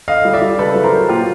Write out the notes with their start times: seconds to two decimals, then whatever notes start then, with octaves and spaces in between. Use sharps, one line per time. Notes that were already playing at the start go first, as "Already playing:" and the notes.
0.08 D3 D#5 F5
0.25 G3
0.33 D5 E5
0.42 G3
0.59 C#3 A4 B4
0.75 F#3
0.84 A#4 C5
0.93 F#3
1.09 A#2 F4 G4